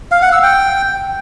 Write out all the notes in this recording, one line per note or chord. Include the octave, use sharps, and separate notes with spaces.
F5
F#5
E6
G5